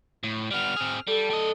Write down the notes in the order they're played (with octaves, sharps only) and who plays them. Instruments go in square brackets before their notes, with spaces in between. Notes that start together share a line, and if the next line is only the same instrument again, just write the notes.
[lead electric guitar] A2
[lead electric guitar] G3 B3 [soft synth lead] F6
[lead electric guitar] C4 G#4
[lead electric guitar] G3 [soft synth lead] A4
[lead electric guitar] G3 D#5